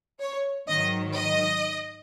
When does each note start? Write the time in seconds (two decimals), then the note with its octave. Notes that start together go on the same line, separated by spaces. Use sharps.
0.20 C#5
0.67 G#2 D#3 F#3 D#5
1.15 D#5